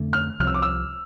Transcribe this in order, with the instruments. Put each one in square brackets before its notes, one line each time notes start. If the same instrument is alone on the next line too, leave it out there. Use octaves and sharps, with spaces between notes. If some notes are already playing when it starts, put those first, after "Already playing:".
Already playing: [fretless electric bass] F2 D3 A3
[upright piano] F6
[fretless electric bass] C2 C3 F3 [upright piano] F6
[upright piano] E6
D6
E6